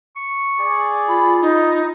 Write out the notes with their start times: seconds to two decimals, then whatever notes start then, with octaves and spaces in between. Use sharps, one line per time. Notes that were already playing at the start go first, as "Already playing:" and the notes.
0.16 C#6
0.60 G#4 D5
1.09 F4 B5
1.41 D#4